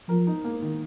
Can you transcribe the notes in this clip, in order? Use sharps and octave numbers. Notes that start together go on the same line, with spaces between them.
F3 A#4
D#4
A#3
D#3